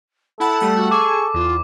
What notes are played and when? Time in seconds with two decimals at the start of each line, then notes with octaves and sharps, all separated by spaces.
0.40 E4 A4 F#5 A5 B5
0.60 G3 A3 F#5
0.75 F#4
0.91 G#4 G#5 C#6 D6
1.34 E2 F4